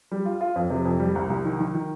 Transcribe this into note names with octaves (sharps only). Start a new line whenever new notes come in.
G3
F4
F4
F2
C3
F2
G3
C2
C2
D#3
D#3
D#3